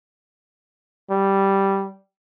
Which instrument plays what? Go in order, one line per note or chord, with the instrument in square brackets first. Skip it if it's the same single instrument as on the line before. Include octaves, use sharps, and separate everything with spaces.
[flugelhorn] G3